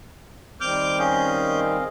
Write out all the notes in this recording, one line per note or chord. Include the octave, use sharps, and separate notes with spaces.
D#3 G3 C4 D6 F6 G6
C#4 G#4 D#5 F5 G6